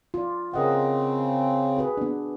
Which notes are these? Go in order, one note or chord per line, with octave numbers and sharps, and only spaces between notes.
F4 D5
C#3 C4 A#4 D#5 F#5
F#4 G#4 B4
B3 D4